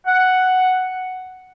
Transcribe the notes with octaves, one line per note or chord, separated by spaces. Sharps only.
F#5